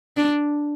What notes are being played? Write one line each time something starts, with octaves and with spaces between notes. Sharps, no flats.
D4